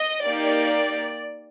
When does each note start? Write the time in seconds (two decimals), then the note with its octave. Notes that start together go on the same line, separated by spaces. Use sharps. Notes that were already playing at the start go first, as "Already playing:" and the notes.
Already playing: D#5
0.24 A#3 D#4 G4 D5